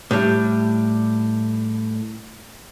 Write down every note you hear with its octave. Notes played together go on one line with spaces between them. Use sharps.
A2 G3